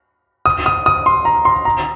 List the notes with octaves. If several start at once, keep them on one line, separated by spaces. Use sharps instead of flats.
D#6
D#6
D#6
C6
A#5
C6
A#5